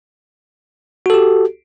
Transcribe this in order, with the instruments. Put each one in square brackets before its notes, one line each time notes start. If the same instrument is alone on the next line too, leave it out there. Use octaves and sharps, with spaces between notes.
[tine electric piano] F#4
A4
G4